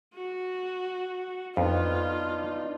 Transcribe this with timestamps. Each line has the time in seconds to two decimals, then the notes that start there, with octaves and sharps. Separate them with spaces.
0.14 F#4
1.57 F2 B3 D4 D#4 F4